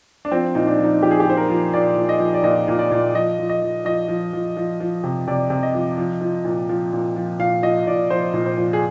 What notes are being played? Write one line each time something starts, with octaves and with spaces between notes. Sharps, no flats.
D4
F3 C4
A#2 D#4
D4
F3
D#4
F3 G4
G#4
G4
A#2 C5
A#4
F3
A#2 D5
A#2
D#5
F3
D5
A#2 D#5
A#2
D5
A#2
F3 D#5
F3
D#5
F3
F3 D#5
F3
F3
F3
F3
C3
C3 D5
C3
D#5
F3
F3
F3
A#2
F3
A#2
F3
A#2 F5
F3 D#5
A#2 D5
F3 C5
A#2
C5
F3
G#4